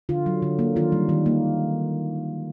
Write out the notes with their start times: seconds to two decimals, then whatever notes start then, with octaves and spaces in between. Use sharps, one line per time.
0.09 D3 F4
0.26 F#3
0.42 D3
0.59 A#3
0.76 D#3 F4
0.92 G3
1.09 D#3
1.26 A#3